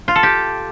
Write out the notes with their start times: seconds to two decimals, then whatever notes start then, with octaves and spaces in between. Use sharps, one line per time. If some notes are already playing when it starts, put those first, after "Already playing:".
0.08 F4
0.15 A4
0.23 G4